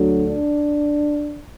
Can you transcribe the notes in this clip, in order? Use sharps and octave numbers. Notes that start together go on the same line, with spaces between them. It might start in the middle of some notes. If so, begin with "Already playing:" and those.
Already playing: D2 D3 F#3
D4